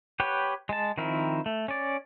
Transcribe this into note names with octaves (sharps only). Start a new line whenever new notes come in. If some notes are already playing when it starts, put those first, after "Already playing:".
G4 B4 C#5 F#5 G5
G#3 A5
D#3 F3 C4 E4 A#4
A3
C#4 D5